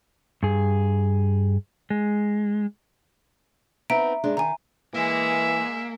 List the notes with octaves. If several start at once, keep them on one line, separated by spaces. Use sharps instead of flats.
G2 G#4
G#3
B3 C4 D#4 E5 A#5 D7
G2 G#3 D4
D#3 G#5 A#5
E3 G#3 A#3 G#4 E5